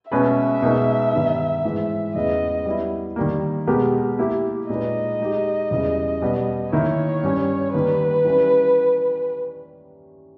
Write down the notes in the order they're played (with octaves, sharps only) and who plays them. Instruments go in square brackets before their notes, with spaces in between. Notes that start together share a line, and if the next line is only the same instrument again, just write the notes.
[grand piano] B2 G#3 C#4 G#4 B4 [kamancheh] E5
[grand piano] B2 G#3 D#4 A#4
G2 D#3 G3 B3 D#4
G#2 E3 G#3
[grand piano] E2 C#3 E3 G#3 B3 [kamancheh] D#5
[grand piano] G3 B3 E4
D#3 G3 A#3
B2 G#3 B3 G4 A#4
A#3 E4 G4
[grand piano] A#2 G#3 D#4 G#4 B4 [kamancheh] D#5
[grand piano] G#3 D#4 G4
E2 C#3 E3 G3
B2 G3 B3
[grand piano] D#3 A#3 E4 [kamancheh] C#5
[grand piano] G2 G3 C#4
[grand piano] D#3 G3 A#3 [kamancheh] B4
[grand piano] E3 G3 C#4